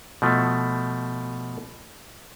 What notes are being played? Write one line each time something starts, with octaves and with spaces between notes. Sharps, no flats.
B2 F3 A3